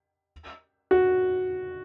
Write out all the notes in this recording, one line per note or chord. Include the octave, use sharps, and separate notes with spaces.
F#4